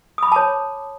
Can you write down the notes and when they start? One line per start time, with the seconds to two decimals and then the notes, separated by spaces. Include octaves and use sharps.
0.18 D#6
0.23 B5
0.27 D6
0.32 A5
0.36 C#5